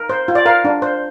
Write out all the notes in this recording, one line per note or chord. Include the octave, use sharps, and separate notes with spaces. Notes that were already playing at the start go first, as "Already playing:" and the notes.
Already playing: A#4
C5
F4
D5
A#4 F5
D4
C5